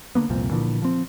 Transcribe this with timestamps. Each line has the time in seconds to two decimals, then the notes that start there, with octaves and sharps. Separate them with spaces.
0.15 D3 A#3 B3
0.30 C2 F2 A#2 C4
0.51 A#2 D3 E3 F3
0.82 F3 C4